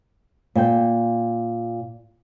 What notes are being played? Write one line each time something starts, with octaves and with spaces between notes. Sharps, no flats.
A#2 G5